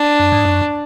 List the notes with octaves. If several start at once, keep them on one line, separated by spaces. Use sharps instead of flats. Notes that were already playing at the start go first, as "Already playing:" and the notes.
Already playing: D4
F#2
G#2
F#2